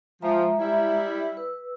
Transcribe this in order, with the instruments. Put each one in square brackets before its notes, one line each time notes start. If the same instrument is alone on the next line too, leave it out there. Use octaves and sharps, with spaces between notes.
[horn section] F3 [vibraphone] G#3 E5 A#5
[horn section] G3 E4
[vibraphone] B4 E6